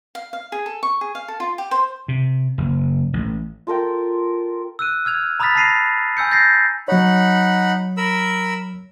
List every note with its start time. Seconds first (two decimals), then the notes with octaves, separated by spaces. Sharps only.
0.15 F5
0.33 F5
0.52 G#4
0.66 A4
0.83 C#6
1.01 G#4
1.15 F5
1.28 A4
1.40 F4
1.58 G4
1.71 C5
2.08 C3
2.58 F#1
3.13 A1
3.67 F4 A4 A#4 G5
4.79 E6 F#6 D#7
5.05 E6 F6 G#6 F7
5.40 A#5 B5 D#6 F6 A6 B6
5.55 A5 A#5 A#6 C7 D#7 F7
6.17 G#5 E6 G6 C#7
6.31 G6 A6 A#6 C7
6.88 F#3 D#4 C#5 F#5 B5
7.97 A#4 B5 E6